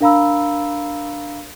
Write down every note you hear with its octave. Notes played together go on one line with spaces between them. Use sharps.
D4 A#4 F5 A#5 B5 E6